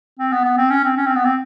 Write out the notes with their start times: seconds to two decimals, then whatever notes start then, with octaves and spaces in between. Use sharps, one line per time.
0.20 C4
0.32 B3
0.45 B3
0.58 C4
0.70 C#4
0.84 C4
0.97 C#4
1.07 C4
1.16 B3
1.25 C4